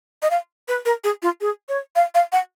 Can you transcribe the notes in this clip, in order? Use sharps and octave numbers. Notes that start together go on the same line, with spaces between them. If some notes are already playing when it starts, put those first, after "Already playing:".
D#5
F5
B4
A#4
G#4
F4
G#4
C#5
F5
F5
F#5